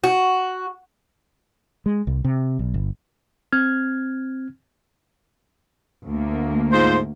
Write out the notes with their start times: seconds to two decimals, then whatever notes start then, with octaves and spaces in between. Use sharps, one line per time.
0.04 F#4
1.86 G#3
2.07 C2
2.24 C3
2.59 B1
2.74 G1
3.52 C4 F6 G#6
6.05 D2 A3 A#3
6.73 G#2 F4 C5